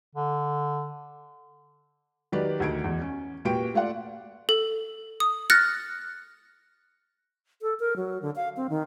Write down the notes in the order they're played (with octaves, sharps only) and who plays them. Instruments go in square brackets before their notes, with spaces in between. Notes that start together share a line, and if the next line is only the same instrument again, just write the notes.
[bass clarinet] D3
[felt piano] D#3 F#3 G4 B4 D5
D2 D#3 G#6 D7
E2
C#4
A#2 F#4 G4 B4 G5 D7
A3 F4 D5 F#5
[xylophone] A4
D#6
F6 F#6 A6 A#6 C#7
[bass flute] A4
A#4
F#3
D3
F5
C4
D#3